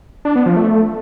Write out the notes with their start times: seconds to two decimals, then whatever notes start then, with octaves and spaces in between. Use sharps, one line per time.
0.25 D4
0.35 B3
0.46 F3
0.56 A3